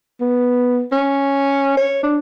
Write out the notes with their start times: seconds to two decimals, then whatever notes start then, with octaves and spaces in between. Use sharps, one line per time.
0.21 B3
0.92 C#4
1.77 C#5
2.03 D4